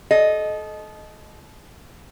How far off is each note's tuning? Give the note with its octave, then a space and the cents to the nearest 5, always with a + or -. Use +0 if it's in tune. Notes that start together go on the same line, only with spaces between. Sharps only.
A4 -30 D#5 +0